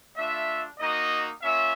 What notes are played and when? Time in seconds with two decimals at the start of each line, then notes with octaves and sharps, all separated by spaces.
0.17 A3 D4 F4 E5
0.79 A#3 D#4 F#4 D#5
1.42 A#3 C#4 F4 E5